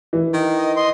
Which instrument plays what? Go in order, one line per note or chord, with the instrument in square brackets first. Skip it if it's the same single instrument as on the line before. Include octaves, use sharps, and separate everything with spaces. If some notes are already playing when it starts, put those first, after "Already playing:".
[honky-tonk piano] E3
[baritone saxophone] D#3
[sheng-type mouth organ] D#5
D#5 C6